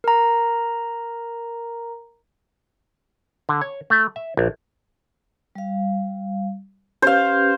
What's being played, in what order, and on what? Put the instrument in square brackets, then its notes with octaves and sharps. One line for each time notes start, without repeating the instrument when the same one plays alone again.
[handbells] A#4 A#5
[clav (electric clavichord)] D3
C#5
A3
E5
A#1
[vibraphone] G3 F5
[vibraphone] C#4 G4 B4 [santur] C5 F5